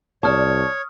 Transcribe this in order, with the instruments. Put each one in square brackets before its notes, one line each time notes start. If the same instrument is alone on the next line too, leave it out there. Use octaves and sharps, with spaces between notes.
[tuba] C2 [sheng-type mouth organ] C#5 [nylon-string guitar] D5 A5 [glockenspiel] C#6 D#6 F6